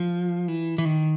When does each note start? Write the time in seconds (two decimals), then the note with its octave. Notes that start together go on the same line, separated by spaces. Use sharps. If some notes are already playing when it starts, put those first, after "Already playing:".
Already playing: F3
0.48 E3
0.78 E3
0.85 D#3